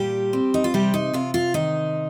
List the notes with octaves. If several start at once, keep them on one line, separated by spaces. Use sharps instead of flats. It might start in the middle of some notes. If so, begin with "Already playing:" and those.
Already playing: A#2 G3 G4
C4
D#4
F4
C3 G3 G4
D#4
C3 F4
F4
D#3 D#4